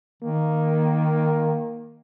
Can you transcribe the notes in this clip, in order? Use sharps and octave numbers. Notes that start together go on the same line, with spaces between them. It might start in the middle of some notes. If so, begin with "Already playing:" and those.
D#3 A#3